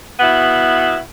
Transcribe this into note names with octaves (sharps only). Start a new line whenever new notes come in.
B2 B3 E4